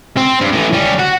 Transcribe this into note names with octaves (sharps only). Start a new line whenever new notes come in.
C4
G2
A2 E3
G3 C#4
F#4